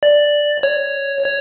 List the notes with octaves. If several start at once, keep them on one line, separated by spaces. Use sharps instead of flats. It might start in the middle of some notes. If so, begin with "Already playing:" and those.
D5
C#5
C#5